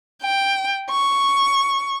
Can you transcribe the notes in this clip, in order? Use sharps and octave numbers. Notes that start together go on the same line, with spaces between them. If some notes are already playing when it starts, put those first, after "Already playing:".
G5
C#6